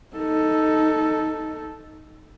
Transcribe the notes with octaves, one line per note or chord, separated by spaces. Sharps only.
D#4 A4